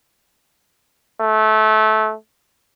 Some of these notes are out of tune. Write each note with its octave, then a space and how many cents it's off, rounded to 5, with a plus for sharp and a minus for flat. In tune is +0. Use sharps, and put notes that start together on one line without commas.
A3 -20